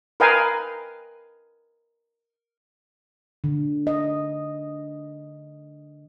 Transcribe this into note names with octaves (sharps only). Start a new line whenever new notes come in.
A#4 B4 D#5 F5 G5 G#5
D3
D#5